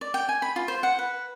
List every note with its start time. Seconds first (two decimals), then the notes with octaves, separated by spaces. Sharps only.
0.01 D5
0.14 G5
0.29 G#5
0.42 B5
0.56 F4
0.68 C5
0.83 F#5
0.99 B4